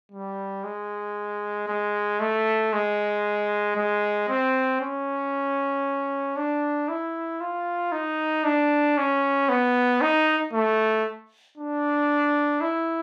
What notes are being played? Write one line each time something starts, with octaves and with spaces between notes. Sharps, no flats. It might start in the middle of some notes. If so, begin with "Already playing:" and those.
G3
G#3
G#3
A3
G#3
G#3
C4
C#4
D4
E4
F4
D#4
D4
C#4
B3
D#4
A3
D4
E4